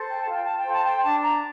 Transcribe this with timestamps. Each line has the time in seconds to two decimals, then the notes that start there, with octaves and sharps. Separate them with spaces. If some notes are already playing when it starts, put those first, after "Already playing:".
Already playing: A4 C5
0.08 G5
0.20 A5
0.27 F4
0.33 G5
0.45 A5
0.58 G5
0.65 A4 C5
0.72 A5
0.84 G5
1.03 D4 A5
1.22 A#5